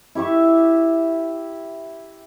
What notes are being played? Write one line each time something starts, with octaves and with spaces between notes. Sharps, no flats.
E4 G4 E5 C#6